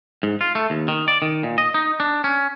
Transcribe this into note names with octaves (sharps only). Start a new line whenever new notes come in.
G#2
F4
A3
D#2
D#3
D5
D#3
A#2
D#5
D#4
D4
C#4